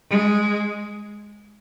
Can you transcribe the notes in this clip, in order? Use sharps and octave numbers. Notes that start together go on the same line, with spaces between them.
G#3